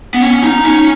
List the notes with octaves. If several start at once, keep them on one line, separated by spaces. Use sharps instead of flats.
B3
C#4
D#4
C#4